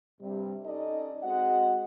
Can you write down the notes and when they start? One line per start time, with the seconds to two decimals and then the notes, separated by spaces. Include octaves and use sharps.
0.21 G2 C3 G3
0.65 C#4 D#4 A4 D5 D#5
1.23 G#3 C4 F#4 D#5 F#5